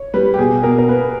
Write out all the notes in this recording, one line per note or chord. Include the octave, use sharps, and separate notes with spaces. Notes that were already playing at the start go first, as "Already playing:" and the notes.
Already playing: C#5
G3 B4
G4
B2 G#4
B2 A#4
A#4
A#3 B4